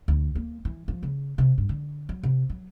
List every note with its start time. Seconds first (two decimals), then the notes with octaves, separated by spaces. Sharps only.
0.08 D2
0.35 A#3
0.65 E3
0.88 F3
1.03 C#3
1.38 C3
1.58 G2
1.69 D3
2.09 F#3
2.23 C3
2.50 F#3